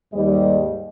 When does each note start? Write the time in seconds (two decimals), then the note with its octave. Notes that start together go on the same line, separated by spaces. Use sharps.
0.13 D#2 G#2 G3 D#5